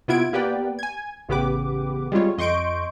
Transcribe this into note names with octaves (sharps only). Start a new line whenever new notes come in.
C3 B3 E4 F4 G#6 D7
A#3 B3 G4 B4 D5 G5
G#5 G#6
A1 C#3 B3 G4 B4 D6
G3 G#3 C4 F4 C#5
F2 D#5 C6 C#6 G6 D7